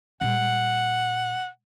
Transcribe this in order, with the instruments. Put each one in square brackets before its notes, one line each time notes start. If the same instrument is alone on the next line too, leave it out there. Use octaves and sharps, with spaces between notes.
[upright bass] A#2 G3 [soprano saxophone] F#5